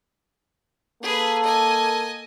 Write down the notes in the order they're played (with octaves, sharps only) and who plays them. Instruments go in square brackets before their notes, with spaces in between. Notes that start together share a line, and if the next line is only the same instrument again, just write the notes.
[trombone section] A#3 A4 [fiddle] G#4 B4
[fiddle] D#5 G#5